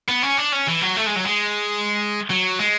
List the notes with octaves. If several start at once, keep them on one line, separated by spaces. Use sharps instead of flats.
B3
C#4
D4
C#4
E3
F#3
A3
G#3
F#3
G#3
F#3
G#3